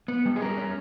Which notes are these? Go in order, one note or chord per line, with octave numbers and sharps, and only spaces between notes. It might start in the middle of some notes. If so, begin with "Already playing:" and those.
B3
G3
G#4
C#4 A#4
C#4